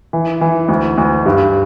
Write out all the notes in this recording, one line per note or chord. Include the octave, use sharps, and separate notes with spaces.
E3
E3
D2
D2
G2